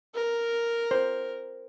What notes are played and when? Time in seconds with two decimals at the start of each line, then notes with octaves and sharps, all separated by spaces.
0.15 A#4
0.91 C5